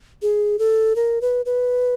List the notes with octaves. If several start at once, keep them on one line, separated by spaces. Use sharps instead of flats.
G#4
A4
A#4
B4
B4